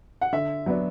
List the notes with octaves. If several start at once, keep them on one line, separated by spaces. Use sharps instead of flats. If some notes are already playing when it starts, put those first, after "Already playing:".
F#5
D3 E5
F#3 B3 D4